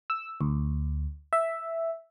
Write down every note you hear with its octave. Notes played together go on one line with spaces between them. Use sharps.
E6
D2
E5